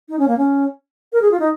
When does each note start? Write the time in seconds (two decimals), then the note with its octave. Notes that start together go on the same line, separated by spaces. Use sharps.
0.09 D#4
0.19 C#4
0.28 A#3
0.38 C#4
1.13 A#4
1.22 G#4
1.31 F4
1.40 D#4